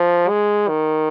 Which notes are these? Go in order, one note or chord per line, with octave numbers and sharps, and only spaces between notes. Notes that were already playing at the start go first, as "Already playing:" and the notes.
Already playing: F3
G#3
D#3